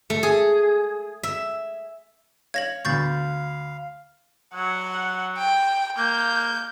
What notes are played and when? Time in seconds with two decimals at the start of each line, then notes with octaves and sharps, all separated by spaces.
0.10 A3
0.23 G#4
1.23 E5
2.54 C#5 F5 G#6 A#6 F#7
2.85 D2 B3 F5 C#6 G6 A6
4.54 F#3 F#5
5.38 G5
5.98 A#3 G6